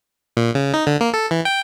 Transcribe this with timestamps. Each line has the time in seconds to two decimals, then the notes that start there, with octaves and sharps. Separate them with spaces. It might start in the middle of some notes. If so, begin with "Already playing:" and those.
0.37 A#2
0.55 C#3
0.74 D#4
0.87 D3
1.01 A#3
1.14 A4
1.31 E3
1.45 G5